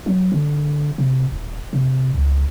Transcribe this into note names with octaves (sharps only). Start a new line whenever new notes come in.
F#3
D3
C3
D#1
C3
C#2